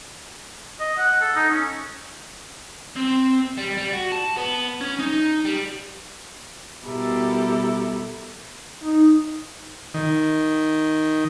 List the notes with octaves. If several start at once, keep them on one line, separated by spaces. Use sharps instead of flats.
D#5
F#5
A4
D#4
C#4
C4
G3
G3
F#4
A5
B3
C#4
D#4
G3
B2 G3 E4 G4 A4 A#4
D#4
D#3